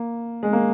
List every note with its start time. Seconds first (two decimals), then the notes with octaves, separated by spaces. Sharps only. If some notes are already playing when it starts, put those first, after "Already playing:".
Already playing: A#3
0.43 G#3
0.53 A#3